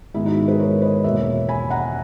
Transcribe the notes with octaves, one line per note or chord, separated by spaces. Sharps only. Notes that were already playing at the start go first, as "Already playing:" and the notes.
G#2 D#3 G#3 B3 E4
D#4 F#4
G#4 B4
A#4 C#5
B4 D#5
E2 B2 A#3 C#5 E5
G#5 B5
F#5 A#5